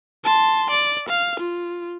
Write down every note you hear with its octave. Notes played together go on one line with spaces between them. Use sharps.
A5 C6
D5
F5
F4